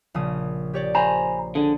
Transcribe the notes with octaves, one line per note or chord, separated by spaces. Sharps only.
A#1 C#3 D#6
G4 C#5 D5
C5 G#5 A#5 B5
D3 G#4